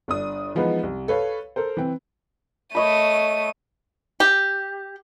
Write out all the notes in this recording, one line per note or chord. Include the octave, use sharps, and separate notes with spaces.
G1 D4 D#6
E3 F3 G#3 B3 D#4 B4
C2
A4 B4 C#5 F5
A4 A#4 C5
E3 C4
A3 C#5 D#5 B5 D#7
G4